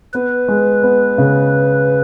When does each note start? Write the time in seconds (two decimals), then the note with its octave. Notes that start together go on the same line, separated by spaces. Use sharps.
0.14 B3 B4
0.48 G#3
0.83 B3
1.18 C#3